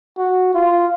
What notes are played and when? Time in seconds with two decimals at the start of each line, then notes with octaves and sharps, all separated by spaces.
0.18 F#4
0.54 F4